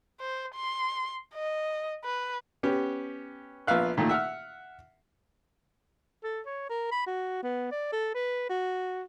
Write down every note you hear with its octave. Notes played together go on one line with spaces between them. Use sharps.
C5
C6
D#5
B4
B3 C#4 G4
A#1 B3 F4 E5 F5 F#6
A#2 D#3 A3
E5 F#5 E6 F6
A4
C#5
A#4
B5
F#4
B3
D5
A4
B4
F#4